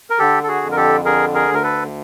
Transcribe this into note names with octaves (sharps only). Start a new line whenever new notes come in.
A#4
D3 G4 A4
A4
F#4 G#4
F2
A#4
G4 A4
D3 G#4 A#4
G#4 A#4
D2
A#4
A4 B4